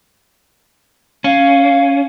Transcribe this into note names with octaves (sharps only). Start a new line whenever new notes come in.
C#4 F5